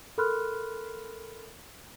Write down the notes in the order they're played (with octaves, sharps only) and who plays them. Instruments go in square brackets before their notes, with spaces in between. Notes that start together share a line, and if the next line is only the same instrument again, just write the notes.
[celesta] A4 A#4 B5 C6 F6 F#6